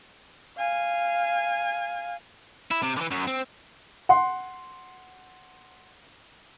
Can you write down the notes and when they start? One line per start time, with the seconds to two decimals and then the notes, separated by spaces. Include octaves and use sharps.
0.58 F5 G#5
2.71 E4
2.82 C3
2.96 D3 E3
3.11 F#2 F#3
3.27 C4
4.09 F#5 C6